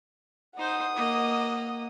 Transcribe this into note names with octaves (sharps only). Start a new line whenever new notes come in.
D#4 C5 F#5 D#6
A#3 D#5